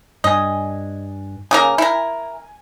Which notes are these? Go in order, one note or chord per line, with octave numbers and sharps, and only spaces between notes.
G2 D4 D#5 G#5
C#3 A#3 A#4 G#5
E4 A#4